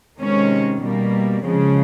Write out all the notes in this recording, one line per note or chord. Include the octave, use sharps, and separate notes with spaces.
C3 D#3 G#3 C#4
B2 G3 A#3
C#3 F3 G#3 C4